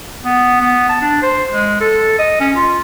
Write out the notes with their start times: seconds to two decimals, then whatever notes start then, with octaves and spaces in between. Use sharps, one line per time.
0.23 B3
0.61 B3
0.89 A5
1.01 D4
1.22 C5
1.52 G#3
1.81 A4
2.19 D#5
2.41 C#4
2.56 F4